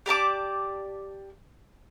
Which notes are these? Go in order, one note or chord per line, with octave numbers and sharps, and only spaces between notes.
G4 D5 A5 D6